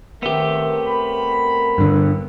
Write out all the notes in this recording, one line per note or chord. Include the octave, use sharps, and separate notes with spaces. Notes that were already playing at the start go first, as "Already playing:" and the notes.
D#3 A3 B3 C4 G4 A#4 E5
B5
G2 D3